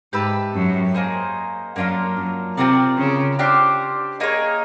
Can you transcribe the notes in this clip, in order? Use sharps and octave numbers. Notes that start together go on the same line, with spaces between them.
G#2 G4 B4 E5 A5
F#2
A#3 D#4 G#4 C5
F#2 A#3 D4 F4 A#4
F#2
C3 C4 F4 A#4 D5
C#3
D4 G4 C5 F5
A#3 D#4 G#4 C#5